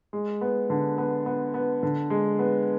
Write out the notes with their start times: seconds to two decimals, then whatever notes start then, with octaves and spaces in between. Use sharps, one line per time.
0.13 G#3
0.41 B3
0.70 D3
0.98 B3
1.26 B3
1.54 B3
1.83 D3
2.10 G#3
2.39 B3